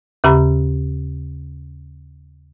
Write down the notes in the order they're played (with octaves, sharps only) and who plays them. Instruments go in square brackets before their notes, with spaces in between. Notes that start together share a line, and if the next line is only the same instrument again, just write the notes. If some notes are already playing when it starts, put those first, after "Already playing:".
[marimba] D#2 C#3 G4 A#5 B5